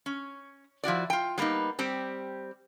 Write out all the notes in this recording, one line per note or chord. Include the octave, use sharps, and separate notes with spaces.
C#4
F3 E4 F#4 D5
F4 G5
F#3 G3 A#3 B3 D#4
G3 C4 G4